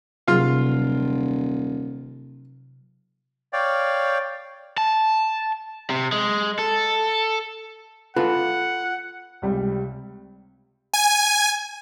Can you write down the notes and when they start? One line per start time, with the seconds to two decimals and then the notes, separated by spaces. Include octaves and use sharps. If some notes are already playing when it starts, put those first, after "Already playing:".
0.28 D#1 C3 F#3 F4 G#4 F5
3.53 C#5 D5 F5 G5
4.78 A5
5.90 C3
6.12 G#3
6.59 A4
8.16 F4 A4 B4 F#5
9.42 C#2 C3 G3
10.94 G#5